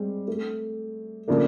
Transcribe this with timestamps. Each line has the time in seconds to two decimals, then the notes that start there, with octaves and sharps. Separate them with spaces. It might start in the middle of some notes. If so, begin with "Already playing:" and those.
Already playing: G3 G#3 C4
0.28 A3
1.28 C#3 F3 A3 A#3 D4